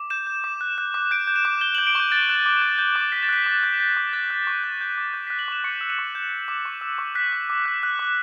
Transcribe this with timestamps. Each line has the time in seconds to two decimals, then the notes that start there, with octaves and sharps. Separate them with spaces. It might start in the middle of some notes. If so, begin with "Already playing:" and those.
Already playing: D6
0.10 G6 E7
0.27 G6
0.44 D6
0.61 F#6
0.78 F#6
0.94 D6
1.11 G6 D7
1.27 G6
1.36 E7
1.45 D6
1.61 G6 G7
1.75 G6 F#7
1.87 D7
1.95 C#6 G6
2.11 F#6 A6
2.29 F#6
2.46 D6
2.62 G6
2.78 G6
2.96 D6
3.12 F#6 B6
3.23 A6
3.29 F#6 B6
3.46 D6
3.63 G6
3.80 G6
3.97 D6
4.13 F#6 A6
4.30 F#6
4.47 C#6
4.64 G6
4.81 G6
4.98 D6
5.13 F#6 G6
5.27 F#6 B6
5.39 F#7
5.48 C#6 E7
5.64 C#6 C#7
5.81 E6
5.90 E7
5.98 C#6
6.15 G6
6.32 G6
6.48 D6
6.65 C#6
6.81 E6
6.98 C#6
7.15 F#6 B6
7.33 F#6
7.50 D6
7.66 F#6
7.83 F#6
7.99 D6